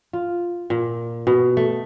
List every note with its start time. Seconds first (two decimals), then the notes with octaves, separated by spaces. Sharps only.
0.13 F4
0.70 A#2
1.27 B2
1.57 A3